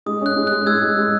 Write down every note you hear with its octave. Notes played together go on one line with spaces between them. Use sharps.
G#3 D#6
C#4 F#6
G#3
G#3 F#6
G#3 E6 G#6
G#3
G#3